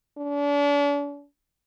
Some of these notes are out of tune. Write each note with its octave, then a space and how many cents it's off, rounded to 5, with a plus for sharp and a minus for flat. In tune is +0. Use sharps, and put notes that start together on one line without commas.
D4 -40